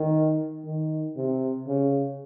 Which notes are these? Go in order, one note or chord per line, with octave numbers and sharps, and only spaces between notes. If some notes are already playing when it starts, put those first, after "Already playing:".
Already playing: D#3
D#3
C3
C#3